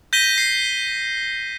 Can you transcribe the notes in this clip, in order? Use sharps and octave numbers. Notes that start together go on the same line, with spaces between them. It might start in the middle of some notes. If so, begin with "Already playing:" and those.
G6 A#6 B6 D#7 G7
C7